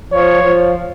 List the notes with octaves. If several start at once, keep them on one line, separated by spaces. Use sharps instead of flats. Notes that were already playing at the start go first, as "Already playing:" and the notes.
F3 C#5
F3